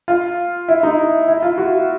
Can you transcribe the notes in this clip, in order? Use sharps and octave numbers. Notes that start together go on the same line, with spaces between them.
F4
E4
D#4
E4
F4
F#4